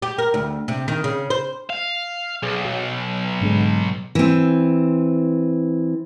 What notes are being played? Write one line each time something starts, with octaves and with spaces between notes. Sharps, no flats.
G4
A#4
D2
C3
D#3
C#3
C5
F5
B1 G#4
F#3
G#2 D3 G#3
E3 C4